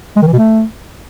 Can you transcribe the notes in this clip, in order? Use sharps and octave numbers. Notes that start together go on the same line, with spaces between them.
G#3
D#3
E3
B2
A3